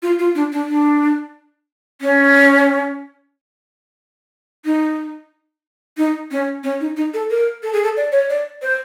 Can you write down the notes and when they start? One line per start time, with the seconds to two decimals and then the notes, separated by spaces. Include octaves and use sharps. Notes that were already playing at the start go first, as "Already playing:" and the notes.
0.02 F4
0.19 F4
0.35 D4
0.52 D4
0.69 D4
2.01 C#4
4.65 D#4
5.97 D#4
6.31 C#4
6.63 C#4
6.80 D#4
6.97 D#4
7.14 A4
7.30 A#4
7.63 A4
7.73 G#4
7.84 A4
7.97 D5
8.12 C#5
8.30 D5
8.62 C5